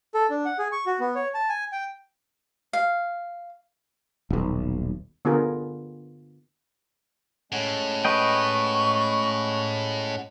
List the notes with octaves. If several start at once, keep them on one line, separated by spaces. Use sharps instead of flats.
A4
D4
F#5
G#4
C#6
F#4
B3
C#5
A5
G#5
G5
F5
D#1 B1
D3 B3 F4 G#4 A#4
A2 G#3 C#4 F#5
B4 D#5 G5 C#6